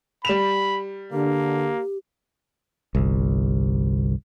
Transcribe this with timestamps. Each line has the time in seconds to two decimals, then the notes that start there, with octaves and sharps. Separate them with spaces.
0.25 G3 B5 E7 F7
1.13 D3 A#3 G4
2.95 G1 C2